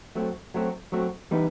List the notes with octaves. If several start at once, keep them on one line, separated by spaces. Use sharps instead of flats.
F#3 A3 C4 F#4
F#3 A3 C4 F#4
F#3 A3 C4 F#4
E3 G3 B3 D#4